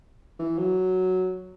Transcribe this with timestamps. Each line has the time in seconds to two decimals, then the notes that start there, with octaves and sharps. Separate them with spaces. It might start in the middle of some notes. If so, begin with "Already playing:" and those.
0.39 E3
0.58 F#3